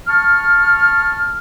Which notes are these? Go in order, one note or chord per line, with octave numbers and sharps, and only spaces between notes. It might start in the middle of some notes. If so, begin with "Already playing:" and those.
A5 C#6 F6